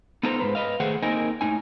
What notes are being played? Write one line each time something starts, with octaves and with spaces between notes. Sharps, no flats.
B3 D#4 F4 A4 C5 A#5
G#2 F#3 B4 C5
B4 C5 D#5 F5
D#3 A3 G#4 C5 F#5
A#3 C4 D#4 A#4 D#5 G#5
A2 D#4 G#5